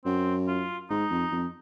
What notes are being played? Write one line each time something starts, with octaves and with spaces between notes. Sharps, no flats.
F#2 C4
F4
G#2 D#4
F2
F2